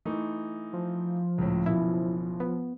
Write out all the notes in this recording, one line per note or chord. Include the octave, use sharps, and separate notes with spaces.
E3 A3 D#4
F3
C#2 A2
F#1 B2 E3 E4
B3